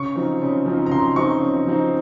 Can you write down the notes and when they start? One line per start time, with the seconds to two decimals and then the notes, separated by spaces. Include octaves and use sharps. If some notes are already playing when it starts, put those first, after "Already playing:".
Already playing: C#3 C#6
0.16 F3 C4 D#4
0.42 C#3
0.66 F3 C4 D#4
0.86 A#5
0.91 C#3 C6
1.16 F3 C4 D#4 C#6
1.42 C#3
1.67 F3 C4 D#4